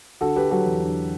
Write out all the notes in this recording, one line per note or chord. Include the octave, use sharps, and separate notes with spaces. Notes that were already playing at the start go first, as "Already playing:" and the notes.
D3 F#4 A4
D3 G4 B4
F#3 F#4 A4
E2
D3